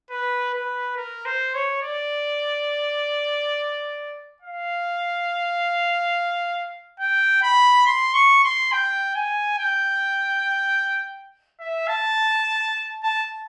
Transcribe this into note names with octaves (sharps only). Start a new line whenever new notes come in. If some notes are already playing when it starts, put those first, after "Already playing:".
B4
B4
A#4
C5
C#5
D5
F5
G5
B5
C6
C#6
C6
G5
G#5
G5
E5
A5
A5